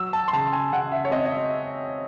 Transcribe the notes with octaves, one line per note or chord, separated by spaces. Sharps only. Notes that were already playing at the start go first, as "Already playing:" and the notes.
Already playing: F#3 E6
A5
C6
C#3 A5
G#5
C#3 F#5
E5
C#5
C4 D#5
D#5
E5